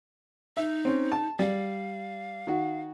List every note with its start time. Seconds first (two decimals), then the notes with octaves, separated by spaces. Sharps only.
0.57 D#4 E5
0.85 C4 C#4
1.12 A5
1.39 G3 F5
2.47 D#3 F#4